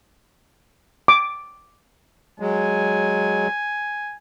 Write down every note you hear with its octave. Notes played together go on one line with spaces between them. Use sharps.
D6
F#3 G#3 G#5